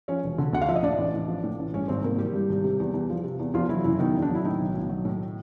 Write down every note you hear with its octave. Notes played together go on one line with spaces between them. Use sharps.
F3 C#4 C#5
E1
D3
D2 F#5
F5
F3 E5
D#5
A2 D4 D5
A1
A1
F3
A2
A1
G2 C#4 C#5
G#1 C4 C5
G#1 A#3 A#4
E3 G3 G4
G2
G#1
C3
E2
E2
F3
C3
E2
E2 F3 F4
E3 F#3 E4
F#1 E3 E4
B2 D#3 D#4
E2
D4
F#3 E4
A2 D#3 D#4
B1
B1
F#3
A2